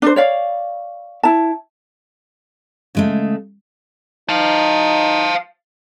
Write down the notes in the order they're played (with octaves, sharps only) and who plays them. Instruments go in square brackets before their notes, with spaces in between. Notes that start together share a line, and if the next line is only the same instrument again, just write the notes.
[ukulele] D4 C5
C#5 D5 F5
E4 A5
[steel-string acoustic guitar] C#3 G#3 A3
[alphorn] D#4 [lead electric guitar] F5 A5